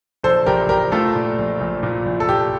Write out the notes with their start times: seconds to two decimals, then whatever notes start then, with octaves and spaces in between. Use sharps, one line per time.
0.23 A#1 A4 C5
0.46 A#1 G4 A#4
0.69 A#1 G4 A#4
0.92 A3 F4 A4
1.15 A#2
1.38 A#1
1.60 A#1
1.83 A#2
2.06 A#1
2.20 A4
2.28 A#2 G4